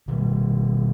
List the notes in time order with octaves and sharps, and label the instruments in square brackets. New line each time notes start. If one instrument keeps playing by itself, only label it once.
[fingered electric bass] B2 D#3 G3